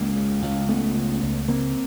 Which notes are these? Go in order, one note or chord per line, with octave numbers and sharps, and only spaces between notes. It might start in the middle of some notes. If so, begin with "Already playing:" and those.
Already playing: C#2 G#3 A#3
C#3
C#2
C#2 A3 B3
C#3
C#2
C#3 A#3 C4